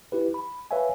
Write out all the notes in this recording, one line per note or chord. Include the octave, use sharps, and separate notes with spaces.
E4 G4 B4
B5
B4 C#5 E5 F5 G#5